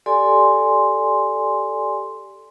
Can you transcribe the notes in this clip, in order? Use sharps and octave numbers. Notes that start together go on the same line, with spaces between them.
G4 A4 D5 G#5 C6